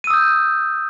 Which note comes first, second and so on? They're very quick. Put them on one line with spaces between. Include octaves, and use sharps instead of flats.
D#7 E6 D#6 G6